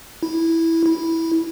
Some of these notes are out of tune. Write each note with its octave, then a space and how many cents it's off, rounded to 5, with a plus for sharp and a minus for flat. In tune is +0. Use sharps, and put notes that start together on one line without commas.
E4 -5
E4 -10